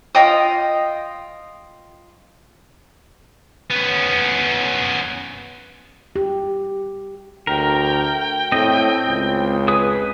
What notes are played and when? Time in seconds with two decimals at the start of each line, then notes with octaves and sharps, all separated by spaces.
0.15 F4 D#5 G5 D#6
3.70 B3 C#4
6.16 G4
7.47 D2 A#4 G5
8.52 A2 C4 D#5
9.08 C#2
9.68 G#4 B4 D#6